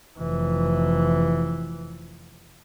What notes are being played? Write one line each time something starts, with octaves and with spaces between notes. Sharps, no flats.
F1 E3